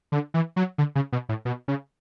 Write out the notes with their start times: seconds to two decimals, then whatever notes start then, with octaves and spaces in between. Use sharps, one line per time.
0.12 D3
0.34 E3
0.56 F#3
0.78 D3
0.95 C#3
1.12 B2
1.29 A2
1.45 B2
1.68 C#3